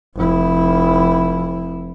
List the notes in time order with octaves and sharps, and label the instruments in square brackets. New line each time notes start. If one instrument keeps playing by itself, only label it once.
[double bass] F1 E4